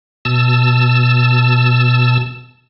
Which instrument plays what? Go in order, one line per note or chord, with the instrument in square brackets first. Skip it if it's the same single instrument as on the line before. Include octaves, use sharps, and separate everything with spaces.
[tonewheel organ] B2 A5 E6